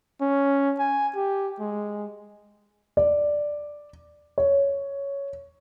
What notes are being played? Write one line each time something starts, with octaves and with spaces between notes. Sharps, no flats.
C#4
G#5
G4
G#3
D5
C#5